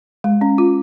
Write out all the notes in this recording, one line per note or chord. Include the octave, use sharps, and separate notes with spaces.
G#3
C#4
F4